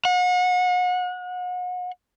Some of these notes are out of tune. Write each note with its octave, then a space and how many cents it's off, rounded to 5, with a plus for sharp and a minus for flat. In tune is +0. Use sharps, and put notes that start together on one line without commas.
F#5 -35